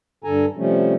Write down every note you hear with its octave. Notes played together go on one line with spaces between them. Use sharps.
G2 D3 A4 G#5 A#5
C3 F3 G3 A3 C#4